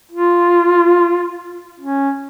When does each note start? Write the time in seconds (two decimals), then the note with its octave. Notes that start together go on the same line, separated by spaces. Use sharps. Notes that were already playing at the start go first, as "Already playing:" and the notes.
0.11 F4
1.80 C#4